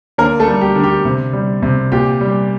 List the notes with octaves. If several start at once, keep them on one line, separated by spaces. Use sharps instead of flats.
D3 A#3 A#4
A3 A4
G3
G4
D3
G4
C3
G3
C3
A#2 G4
G3